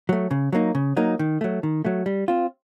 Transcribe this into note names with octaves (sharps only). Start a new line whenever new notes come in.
F#3 A3
C#3
F#3 A#3 D#4
C#3
F#3 A#3 D#4
D#3
F#3 A3
D#3
F#3 A3
G3
C4 F4